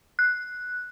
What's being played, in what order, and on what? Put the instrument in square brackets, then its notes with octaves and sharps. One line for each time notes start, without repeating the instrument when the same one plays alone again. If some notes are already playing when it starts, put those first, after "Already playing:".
[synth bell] F#6